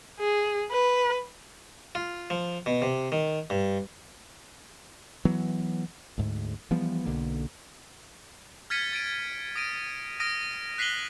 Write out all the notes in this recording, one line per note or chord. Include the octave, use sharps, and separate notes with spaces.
G#4
B4
F4
F3
B2
C3
D#3
G2
E3 F#3 B3
D2 G#2
E3 F3 G3 B3
B1 D3 A#3
F6 G#6 A6 B6 C#7 D#7
A6 D7 D#7
D#6 A#6 D7 D#7
D#6 F6 A#6 D7 D#7
F#6 B6 C7 D#7 F#7 G7